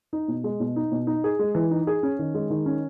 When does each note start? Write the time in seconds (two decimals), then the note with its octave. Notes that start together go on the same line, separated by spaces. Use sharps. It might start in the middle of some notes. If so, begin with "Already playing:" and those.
0.13 D#4
0.28 B2
0.44 G#3
0.60 B2
0.76 D#4
0.92 B2
1.07 D#4
1.24 G#4
1.39 G#3
1.55 E3
1.71 D#4
1.87 G#4
2.03 C#4
2.19 D#3
2.34 G#3
2.50 D#3
2.66 C#4